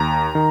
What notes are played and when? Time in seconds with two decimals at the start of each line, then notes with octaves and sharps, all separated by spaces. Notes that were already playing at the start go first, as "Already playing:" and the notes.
Already playing: D#2 A#5
0.35 D#3